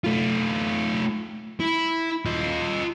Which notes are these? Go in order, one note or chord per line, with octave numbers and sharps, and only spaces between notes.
A3 F4
E4
F4 D#5